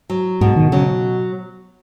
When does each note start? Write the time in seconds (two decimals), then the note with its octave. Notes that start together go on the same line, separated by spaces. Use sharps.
0.10 F#3
0.41 G#2 B2
0.56 D#3
0.72 C#3 F#3